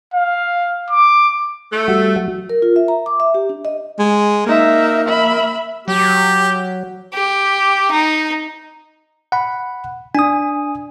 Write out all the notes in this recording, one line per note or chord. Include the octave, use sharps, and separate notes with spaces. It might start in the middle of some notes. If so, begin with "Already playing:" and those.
F5
D6
A3
G3 F#4
F#3
A#4
F4
E5
A#5
D6
E5
G4
D4
D#5
G#3
A#3 D#4 E5
E5 B5
F#3 G4
G4
D#4
F#5 B5
D4 G#5 D#6